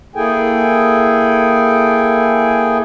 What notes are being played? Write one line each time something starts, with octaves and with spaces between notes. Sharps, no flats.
A#3 E4 G#4 A4 G5 G#5